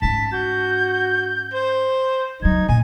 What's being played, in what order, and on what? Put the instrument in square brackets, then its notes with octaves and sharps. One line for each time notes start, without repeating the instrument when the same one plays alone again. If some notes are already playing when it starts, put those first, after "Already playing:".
[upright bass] G#2 C#4 [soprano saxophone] A5 [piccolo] B6
[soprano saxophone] F#4 [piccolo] G6
[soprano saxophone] C5
[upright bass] C#2 F#3 [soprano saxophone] D#4 [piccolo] G#6
[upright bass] A#2 [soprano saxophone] G#5